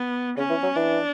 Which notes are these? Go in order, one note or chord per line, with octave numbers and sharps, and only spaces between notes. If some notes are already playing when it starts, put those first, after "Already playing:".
Already playing: B3
C#3 C#4
E3
F#3
E3 D4